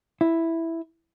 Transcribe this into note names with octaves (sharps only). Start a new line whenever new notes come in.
E4